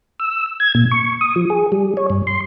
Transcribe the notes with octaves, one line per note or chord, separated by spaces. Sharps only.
E6
G#6
A#2
C#6
D#6
F3
G#4
G3
C#5
G2
C6